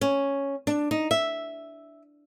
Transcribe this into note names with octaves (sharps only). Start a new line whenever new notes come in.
C#4
D4
D#4
E5